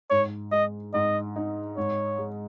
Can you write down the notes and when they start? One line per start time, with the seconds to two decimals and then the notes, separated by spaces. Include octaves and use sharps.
0.10 G#2 C#5
0.51 G#3 D#5
0.94 G#2 D#5
1.36 D#4
1.77 G#2 C#5
2.18 G#3